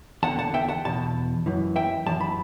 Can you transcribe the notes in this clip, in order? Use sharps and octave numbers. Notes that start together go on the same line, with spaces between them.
E2 D3 F#5 A5
F#5 A5
E5 G5
F#5 A5
E2 B2 A5
F#2 E3
E5 G5
F#2 E3 A5
B5